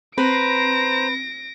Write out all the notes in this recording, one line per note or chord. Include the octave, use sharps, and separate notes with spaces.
C4 B4 C5 A#5 A#6 C7 D7